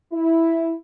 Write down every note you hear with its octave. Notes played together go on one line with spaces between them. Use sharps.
E4